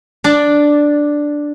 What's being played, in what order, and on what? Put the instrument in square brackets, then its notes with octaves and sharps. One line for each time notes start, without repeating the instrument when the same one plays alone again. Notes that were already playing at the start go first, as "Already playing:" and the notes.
[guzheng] D4 D5